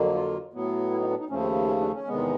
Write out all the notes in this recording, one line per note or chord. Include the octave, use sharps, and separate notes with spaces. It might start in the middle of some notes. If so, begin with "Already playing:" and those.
Already playing: F2 D3 F#3 A#3
F4
A2 F#3 B3
E4
D#4
D4
D#4
D#2 C#3 F3 A3 C#4
C4
C#4
D4
C#4
E2 C3 D#3 G#3 B3